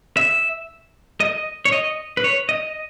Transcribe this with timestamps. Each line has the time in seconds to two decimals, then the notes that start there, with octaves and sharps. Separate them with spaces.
0.17 E5
1.20 D#5
1.65 C#5
1.72 D#5
2.17 B4
2.24 C#5
2.49 D#5